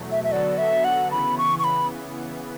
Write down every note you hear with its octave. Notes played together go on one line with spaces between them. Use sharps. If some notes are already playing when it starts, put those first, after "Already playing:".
Already playing: E2 B2 F#3 A3
E5
E5
D3 F#3 B3 F#4 A4 D5
E5
F#5
C#3 E3 B3 B5
C#6
C#6
B5